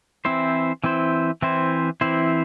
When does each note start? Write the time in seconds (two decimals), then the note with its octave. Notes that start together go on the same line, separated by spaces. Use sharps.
0.25 E3 C4 E4 C5
0.84 E3 C4 E4 C5
1.42 E3 C4 E4 C5
2.01 E3 C4 E4 C5